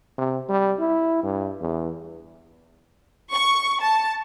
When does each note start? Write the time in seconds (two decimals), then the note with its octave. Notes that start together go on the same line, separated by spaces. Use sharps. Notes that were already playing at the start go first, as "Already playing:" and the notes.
0.18 C3
0.49 G3
0.80 E4
1.23 G2
1.61 E2
3.31 C#6
3.82 A5